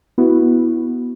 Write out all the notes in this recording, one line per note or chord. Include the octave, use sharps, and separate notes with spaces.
B3 E4 F#4